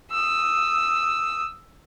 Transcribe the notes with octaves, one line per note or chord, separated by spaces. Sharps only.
D#6 E6